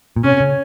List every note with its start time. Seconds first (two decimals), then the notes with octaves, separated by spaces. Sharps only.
0.16 A#2
0.24 C3 C#4
0.40 C#3